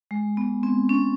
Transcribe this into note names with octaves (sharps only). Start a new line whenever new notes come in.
G#3
B3
C4
C#4